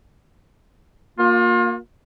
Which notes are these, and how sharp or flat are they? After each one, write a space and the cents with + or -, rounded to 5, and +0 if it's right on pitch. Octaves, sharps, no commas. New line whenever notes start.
A#3 +0 F4 +35